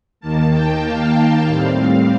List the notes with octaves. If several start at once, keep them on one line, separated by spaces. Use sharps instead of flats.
D#2 D#3 A#3 A5
G5
F5
A2 G3 C4